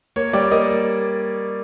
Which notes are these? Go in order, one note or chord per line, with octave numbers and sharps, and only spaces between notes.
A#3 C#5
G3 D5
A#3 D#5